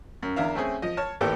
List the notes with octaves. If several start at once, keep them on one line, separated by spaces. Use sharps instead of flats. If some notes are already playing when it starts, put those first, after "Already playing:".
F#2
E2 D3 A#4 E5 F5
A3 C4 C#4 G#4
F3 D#5
C#5 A5 F6
G#1 A2 A#3 B3 G4 A4